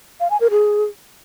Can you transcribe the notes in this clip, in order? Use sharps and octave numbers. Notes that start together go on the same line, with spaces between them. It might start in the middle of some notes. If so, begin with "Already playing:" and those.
F5
G#5
A#4
G#4